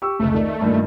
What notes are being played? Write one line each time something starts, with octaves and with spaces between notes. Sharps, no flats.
G4 C#6 E6
F1 C#2 A3
D#3 D5
G2 A#2 D#3